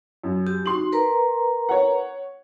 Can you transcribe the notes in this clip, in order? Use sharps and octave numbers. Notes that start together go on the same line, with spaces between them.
F#2
G4
D#4 F#4 C6 F#7
A#4 B4 A#5
C#5 F#5